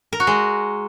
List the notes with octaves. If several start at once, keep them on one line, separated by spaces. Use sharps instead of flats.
A#4
F#4
G#3